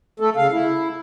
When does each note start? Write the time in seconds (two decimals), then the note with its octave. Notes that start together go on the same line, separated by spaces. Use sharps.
0.20 A3 A4
0.37 C#3 F5
0.52 E4